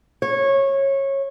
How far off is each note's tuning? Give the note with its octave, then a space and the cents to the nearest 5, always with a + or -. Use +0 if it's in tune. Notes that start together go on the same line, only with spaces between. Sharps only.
C#5 -20